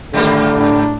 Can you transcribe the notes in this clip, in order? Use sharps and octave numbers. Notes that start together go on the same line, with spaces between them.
G#2 D3 D#3 G3 A3 A#3
A2 D4